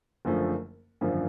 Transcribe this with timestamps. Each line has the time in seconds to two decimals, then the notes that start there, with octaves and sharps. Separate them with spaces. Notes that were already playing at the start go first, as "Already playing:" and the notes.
0.25 F#1 F#2 D3 F3 A3
1.01 G#1 F#2 D3 F3 A#3